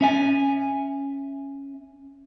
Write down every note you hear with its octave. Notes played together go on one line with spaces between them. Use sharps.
C#4 E5 G#5